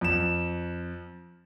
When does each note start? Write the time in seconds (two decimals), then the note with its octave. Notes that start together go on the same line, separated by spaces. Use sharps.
0.01 F2 E7